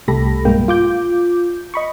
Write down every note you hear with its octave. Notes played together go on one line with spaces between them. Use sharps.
C2 A3 G4 A4 B5 A#6
B1 G2 G#3 A#3 G5
F4 D6 G6
D#5 B5 C#6